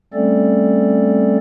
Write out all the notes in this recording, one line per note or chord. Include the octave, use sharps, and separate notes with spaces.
G3 A3 C4 C#4 A4 D5